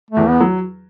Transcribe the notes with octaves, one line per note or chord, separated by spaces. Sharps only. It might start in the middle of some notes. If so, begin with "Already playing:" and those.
A3
E2 E3
B3
F#3